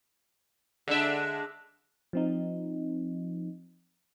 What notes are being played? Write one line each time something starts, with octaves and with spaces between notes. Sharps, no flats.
D3 G#3 D4 E5
F3 C4 D#4